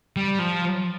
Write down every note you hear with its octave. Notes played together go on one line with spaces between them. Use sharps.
G3
F3